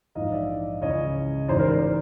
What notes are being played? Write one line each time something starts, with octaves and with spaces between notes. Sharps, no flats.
A#1 G#2 E3 D#5 F5
D5 E5
C#2 C#3 E3 C#5 D#5
A1 G#2 E3 C5 D5
A#4 C5
C5 D5